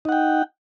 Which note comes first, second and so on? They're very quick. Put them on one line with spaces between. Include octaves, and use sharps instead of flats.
D#4 F#5 G5